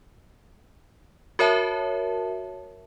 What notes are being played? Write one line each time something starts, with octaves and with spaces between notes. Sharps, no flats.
F#4 A#4 C#5 E5 A5